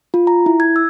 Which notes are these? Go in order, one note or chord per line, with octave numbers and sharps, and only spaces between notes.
F4
A#5
E4
G#6
E6